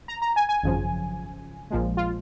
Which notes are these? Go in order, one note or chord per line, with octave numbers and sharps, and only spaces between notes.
A#5
A#5
G#5
G#5
G#1 F#2 C#3 F3
A#1 A#2 F3 G#3
F4